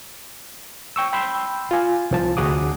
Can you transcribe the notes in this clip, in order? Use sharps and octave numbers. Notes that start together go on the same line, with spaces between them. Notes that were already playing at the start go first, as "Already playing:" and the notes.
G5 C#6 E6
G5 B5 C6 E6 G6
F4 G#5
C2 F3 A5
D2 F#4 G#4 F#5 D6 D#6